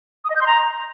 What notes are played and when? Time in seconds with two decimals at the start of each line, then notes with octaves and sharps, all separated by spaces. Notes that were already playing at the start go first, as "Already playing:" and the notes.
0.25 D#6
0.30 D#5
0.36 G6
0.41 C6
0.47 A#5